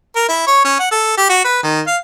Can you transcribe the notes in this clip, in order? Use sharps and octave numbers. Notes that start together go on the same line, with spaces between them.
A#4
E4
C#5
C#4
F#5
A4
G4
F#4
B4
D#3
F5